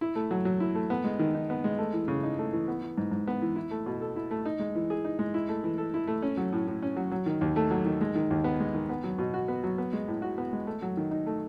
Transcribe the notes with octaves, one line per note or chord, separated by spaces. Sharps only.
E4
A3
F#3
F#3
E4
A3
B3
G#3
D#3
D#4
B3
G#3
A3
E3
C#3
D#4
A3
E3
B3
E3
G#2
G#2
B3
E3
E4
A3
B2
A4
E4
A3
D#4
G#3
E3
G#4
D#4
G#3
E4
A3
E3
A4
E4
A3
C#4
F#3
A2
A2
C#4
F#3
F#3
D#3
D#2
A3
F#3
D#3
G#3
D#3
D#2
B3
G#3
D#3
B3
F#3
B2
F#4
B3
F#3
B3
G#3
A2
F#4
B3
G#3
A3
F#3
D#3
D#4
A3